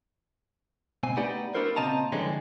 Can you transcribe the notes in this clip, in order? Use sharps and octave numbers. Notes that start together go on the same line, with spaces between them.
C#2 B2 C4 G#5
A3 B3 D#4 G4 D5
B3 D4 E4 F#4 A#4 C5
A#2 C#3 C4 D#5 A5 A#5
D3 E3 F3 G3 G#3 C#4